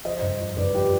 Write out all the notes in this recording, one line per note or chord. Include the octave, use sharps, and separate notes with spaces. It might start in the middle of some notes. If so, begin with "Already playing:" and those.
F3 C5 D#5
G2
F3
G2 B4 D5
F3 G4 B4